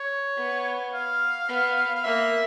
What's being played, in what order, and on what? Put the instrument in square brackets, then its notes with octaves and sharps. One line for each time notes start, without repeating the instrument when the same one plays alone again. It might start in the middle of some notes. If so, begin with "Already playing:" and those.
Already playing: [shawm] C#5
[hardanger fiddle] B3
[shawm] F5
[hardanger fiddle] B3
[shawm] F5
[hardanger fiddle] A#3 [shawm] E5